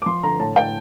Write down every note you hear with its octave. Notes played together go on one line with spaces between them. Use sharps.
D6
F3 C6
D3 A#5
A2 A5
A2 G5